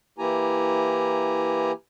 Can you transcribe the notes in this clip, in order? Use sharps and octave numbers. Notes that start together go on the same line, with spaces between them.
E3 A#3 E4 G4 G#5 A#5